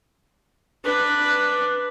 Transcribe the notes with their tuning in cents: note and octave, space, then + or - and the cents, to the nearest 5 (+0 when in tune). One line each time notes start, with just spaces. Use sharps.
D4 +5 B4 +0